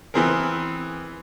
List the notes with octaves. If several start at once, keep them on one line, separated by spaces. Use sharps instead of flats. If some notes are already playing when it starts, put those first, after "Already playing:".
E3 B3 C4 G#4 A#4